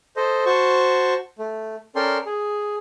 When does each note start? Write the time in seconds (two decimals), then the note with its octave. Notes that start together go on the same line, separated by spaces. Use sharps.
0.16 A4 C5 D#5
0.46 F#4 C5 A5 C#6
1.39 A3
1.96 C#4 A4 A#4 D5 G5 C6
2.26 G#4